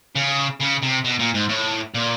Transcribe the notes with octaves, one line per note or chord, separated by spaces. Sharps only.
C#3
C#3
C3
B2
A#2
G#2
A2
A#2